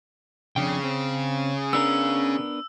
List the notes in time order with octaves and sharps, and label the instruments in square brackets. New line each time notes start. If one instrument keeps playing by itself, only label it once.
[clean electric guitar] F2 D4 G5 [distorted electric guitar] C#3
[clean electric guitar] C4
[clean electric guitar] B3 D4 A#4 [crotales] E6